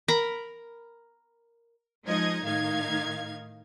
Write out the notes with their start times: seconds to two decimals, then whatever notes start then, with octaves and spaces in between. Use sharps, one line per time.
0.08 A#4 A#5 B5
2.06 F3 G#3 D#4 D#5 G#6
2.43 A2 D#3 D#4 F5 G#6